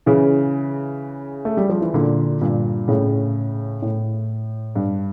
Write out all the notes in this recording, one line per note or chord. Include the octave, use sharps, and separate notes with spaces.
C#3 E3
A3
G3
F3
E3
A#2 D3
G2 A#2
A2 C#3
A2
G2